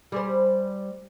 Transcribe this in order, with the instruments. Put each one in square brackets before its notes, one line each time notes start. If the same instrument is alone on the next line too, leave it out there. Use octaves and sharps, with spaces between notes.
[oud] G3 G#4 C5